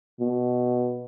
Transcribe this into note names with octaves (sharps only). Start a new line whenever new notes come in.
B2